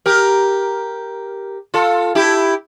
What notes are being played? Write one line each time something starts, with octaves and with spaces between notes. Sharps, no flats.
G4 A#4
F4 A4
E4 G4